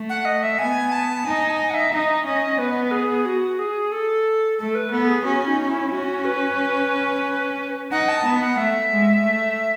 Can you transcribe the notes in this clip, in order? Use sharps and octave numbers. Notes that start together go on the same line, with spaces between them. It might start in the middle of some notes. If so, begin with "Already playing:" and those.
Already playing: A3
F#5
D#5
E5
B3 G#5
A5
D#4 G#5
A5
G#5
F#5
E5
D#4 D#5
C#4 D#5
B3 B4
G#4
F#4
G#4
A4
A3 A4
B4
B3 A4
G#4
C#4 F#4
D#4
E4
C#4 F#4
B4
D#4 F#5
A5
B3
F#5
A3 E5
G#3
A3